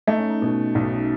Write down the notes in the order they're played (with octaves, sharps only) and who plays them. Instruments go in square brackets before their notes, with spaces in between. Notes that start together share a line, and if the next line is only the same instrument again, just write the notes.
[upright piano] A3 [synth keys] D#4
[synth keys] C#4
D#4
[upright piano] B2
B1